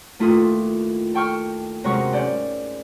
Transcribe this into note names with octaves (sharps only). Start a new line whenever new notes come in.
D#2 A3 E4 F4 A4 D#6
A4 G5 C#6 F6
F#2 C3 G#3 A#4 C#6
G#2 C#4 D5 G6